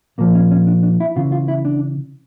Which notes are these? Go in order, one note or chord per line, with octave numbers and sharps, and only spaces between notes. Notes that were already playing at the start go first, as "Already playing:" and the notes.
A#2 F3 A#3
C#4
C#4
D4
D4
E4
C#3 E3 F4
F4
E4
D4